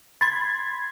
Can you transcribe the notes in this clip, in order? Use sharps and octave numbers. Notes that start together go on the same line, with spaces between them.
B5 C6 G#6 A6